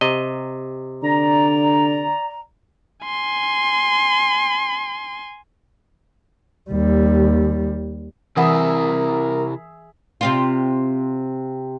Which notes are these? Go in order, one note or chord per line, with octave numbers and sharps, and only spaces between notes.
C3 D#5
D3 D5 A#5
G#5 C6
D#2 G3
C3 E3 E4 G#4 A#4 E5 F#5 B5
C3 C4 F4